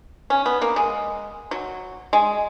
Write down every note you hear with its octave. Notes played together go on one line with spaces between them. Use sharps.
C#4
B3
A#3
G#3
F#3
G#3